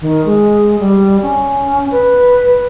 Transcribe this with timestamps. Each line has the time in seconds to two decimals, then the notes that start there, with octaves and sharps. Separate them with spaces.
0.01 D#3
0.25 G#3
0.80 G3
1.23 C#4
1.91 B4